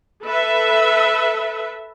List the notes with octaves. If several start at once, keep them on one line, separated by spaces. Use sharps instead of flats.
A4 B4 E5